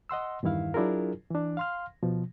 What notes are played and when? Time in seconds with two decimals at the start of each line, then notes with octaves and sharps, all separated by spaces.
0.09 D#5 F#5 C6 E6
0.43 E2 G2 D#3 E4 F5
0.74 F#3 D4 E4 F4 G#4 A#4
1.30 E3 D4
1.57 F5 C6 F6
2.03 B2 F3